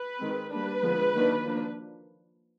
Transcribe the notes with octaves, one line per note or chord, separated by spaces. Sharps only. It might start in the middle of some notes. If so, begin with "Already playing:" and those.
Already playing: B4
D#3 G#3 C4
G3 A#3 D4 B4
D3 F3 G#3 B3
D#3 F#3 A#3 D4
F3 A#3 D4